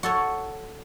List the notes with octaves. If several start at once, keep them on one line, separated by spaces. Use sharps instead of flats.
F#4 A4 C#5